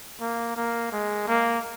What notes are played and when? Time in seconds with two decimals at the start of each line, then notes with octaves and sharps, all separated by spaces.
0.21 A#3
0.56 A#3
0.92 G#3
1.27 A#3